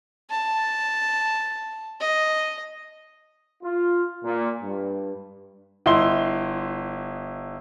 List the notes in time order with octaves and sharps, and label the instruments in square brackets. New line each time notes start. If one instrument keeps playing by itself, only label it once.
[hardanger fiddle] A5
D#5
[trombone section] F4
A#2
G2
[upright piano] G1 E4 D#5 C6 G7